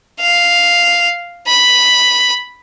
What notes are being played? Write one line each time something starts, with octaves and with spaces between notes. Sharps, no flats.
F5
B5